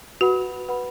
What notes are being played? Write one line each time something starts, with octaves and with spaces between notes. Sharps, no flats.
F#4 B4 F#5 B5
B4 F#5 B5